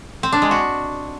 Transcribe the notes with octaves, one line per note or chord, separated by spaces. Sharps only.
C4
D4
G#3
F#4